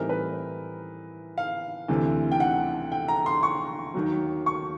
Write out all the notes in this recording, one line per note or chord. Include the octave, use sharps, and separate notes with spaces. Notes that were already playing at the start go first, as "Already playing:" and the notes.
Already playing: A2 E3 G3 C4 D#4 A#4
B4
F5
D2 C3 E3
G5
F#5
G5
A#5
C6
C#6
D#2 D#3 F#3
C#6